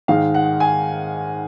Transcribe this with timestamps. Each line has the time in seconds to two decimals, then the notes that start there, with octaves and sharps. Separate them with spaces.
0.08 G#2 D#3 G#3 F5
0.34 F#5
0.60 G#5